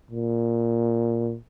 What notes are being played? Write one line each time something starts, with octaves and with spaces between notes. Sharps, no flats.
A#2